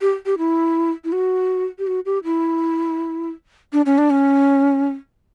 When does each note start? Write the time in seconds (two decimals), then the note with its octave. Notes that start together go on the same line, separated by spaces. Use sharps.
0.01 G4
0.26 G4
0.38 E4
1.04 E4
1.12 F#4
1.79 G4
1.87 F#4
2.06 G4
2.24 E4
3.73 D4
3.86 C#4
3.98 D4
4.10 C#4